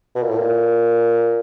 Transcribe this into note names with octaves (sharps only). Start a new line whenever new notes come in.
B2
A#2
A2
A#2